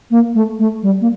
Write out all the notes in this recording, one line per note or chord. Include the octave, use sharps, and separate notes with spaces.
A#3
A3
A3
G3
A#3